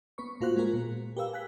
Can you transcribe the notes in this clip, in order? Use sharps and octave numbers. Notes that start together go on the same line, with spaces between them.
B3 B4 C#6
A2 A#3 F4 F#4 C5 F#6
G#3 A#3 B3 F4 G#4 A#4
A#2
G4 G#4 A#4 B4 F5 E6
G#5 F#6 B6